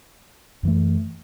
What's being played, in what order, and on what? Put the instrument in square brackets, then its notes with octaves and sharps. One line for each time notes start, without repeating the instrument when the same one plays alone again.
[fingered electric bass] F#2 E3 A3